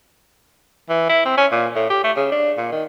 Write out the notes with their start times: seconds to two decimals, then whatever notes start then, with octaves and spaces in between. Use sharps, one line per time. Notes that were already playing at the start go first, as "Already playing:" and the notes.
0.89 E3
1.09 E4
1.25 C4
1.37 C#4
1.51 A#2
1.75 A2
1.90 G4
2.04 A3
2.16 C#3
2.32 D4
2.57 A#2
2.72 D#3